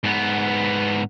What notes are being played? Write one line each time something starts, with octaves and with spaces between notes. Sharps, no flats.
G#2 B3